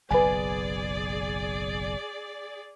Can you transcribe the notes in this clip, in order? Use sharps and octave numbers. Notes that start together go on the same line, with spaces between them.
F#1 B1 G#4 B4 D5 G#5